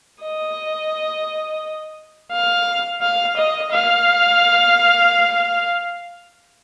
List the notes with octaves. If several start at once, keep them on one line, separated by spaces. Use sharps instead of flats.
D#5
F5
F5
D#5
F5